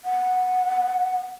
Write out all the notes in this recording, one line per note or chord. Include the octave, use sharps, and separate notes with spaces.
F#5